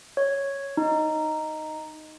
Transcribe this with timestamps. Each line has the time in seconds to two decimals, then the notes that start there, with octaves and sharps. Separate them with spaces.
0.17 C#5
0.77 D#4